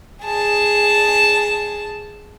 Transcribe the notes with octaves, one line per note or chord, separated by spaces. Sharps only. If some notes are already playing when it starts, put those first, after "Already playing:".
G#4 A5